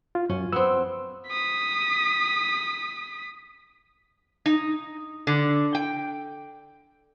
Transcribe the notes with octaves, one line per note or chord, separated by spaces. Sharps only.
F4
F#2 C#4
B3 C4 E6
D#6 B6
D#4
D3
G5